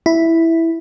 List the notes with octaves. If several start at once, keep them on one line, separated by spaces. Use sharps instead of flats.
E4